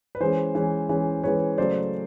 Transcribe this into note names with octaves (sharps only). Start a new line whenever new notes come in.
B4
E3 G#3 C#4 C5
E3 G#3 C#4
E3 G#3 C#4
E3 G#3 C#4 B4 C#5
C#3 F#3 A3 C5 D5